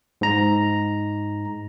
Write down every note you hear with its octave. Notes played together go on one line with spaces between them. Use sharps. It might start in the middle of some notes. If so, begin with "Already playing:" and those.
G#2 A#5